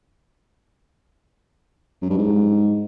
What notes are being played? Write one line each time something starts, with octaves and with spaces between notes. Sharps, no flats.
F#2
G2
G#2